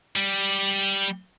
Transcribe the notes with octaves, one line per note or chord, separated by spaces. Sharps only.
G3